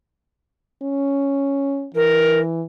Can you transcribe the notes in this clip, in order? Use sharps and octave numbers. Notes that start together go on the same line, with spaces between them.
C#4
E3 A#4